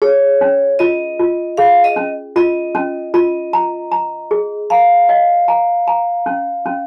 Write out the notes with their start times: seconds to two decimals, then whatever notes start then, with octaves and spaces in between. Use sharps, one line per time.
0.02 G#4 C#5
0.41 C#4
0.79 F4 D#5
1.19 F4
1.57 G#4 F5
1.84 D#5
1.96 C#4
2.36 F4 D#5
2.75 C#4
3.14 F4 D#5
3.53 A#5
3.92 A#5
4.31 G#4
4.70 F5 A#5
5.09 D#5
5.48 A#5
5.88 A#5
6.26 C#4
6.66 C#4